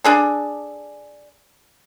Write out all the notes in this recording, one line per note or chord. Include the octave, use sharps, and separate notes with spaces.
D4 G#4 A4